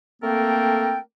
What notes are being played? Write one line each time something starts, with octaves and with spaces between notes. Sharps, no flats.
A3 A#3 C4 A4 A#4 G5